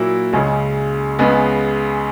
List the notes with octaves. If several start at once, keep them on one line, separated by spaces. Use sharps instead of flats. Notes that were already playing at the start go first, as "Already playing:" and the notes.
Already playing: A#2 F#3 A#3 E4
C#2 C#3 G#3 C#4
C#2 C#3 G#3 B3